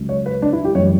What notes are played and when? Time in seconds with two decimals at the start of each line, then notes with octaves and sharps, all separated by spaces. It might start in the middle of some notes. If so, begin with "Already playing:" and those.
Already playing: C#2 C#3 F#3
0.09 C#5
0.26 B4
0.42 D4
0.53 E4
0.65 G4
0.75 F#2 C#5
0.78 E3 G3